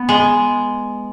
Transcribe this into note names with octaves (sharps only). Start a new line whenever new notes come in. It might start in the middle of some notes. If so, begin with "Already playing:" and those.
Already playing: B3
G#3